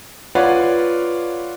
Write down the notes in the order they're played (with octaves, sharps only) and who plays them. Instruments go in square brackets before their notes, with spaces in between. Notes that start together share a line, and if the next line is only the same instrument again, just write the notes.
[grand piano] F4 B4 C#5 D5 F5 F#5